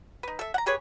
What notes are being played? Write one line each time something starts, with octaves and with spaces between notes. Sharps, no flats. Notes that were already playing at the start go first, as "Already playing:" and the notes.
D#4 B4
A4 E5
F#5 A#5
G4 G#4 B4 C#5